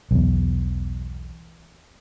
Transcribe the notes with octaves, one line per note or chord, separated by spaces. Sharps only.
B1 E2